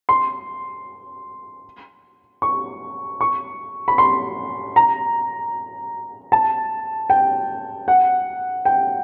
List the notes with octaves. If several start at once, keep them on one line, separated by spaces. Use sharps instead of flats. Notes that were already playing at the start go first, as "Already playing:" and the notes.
C6
C#6
C#6
B5
C6
A#5
A5
G5
F#5
G5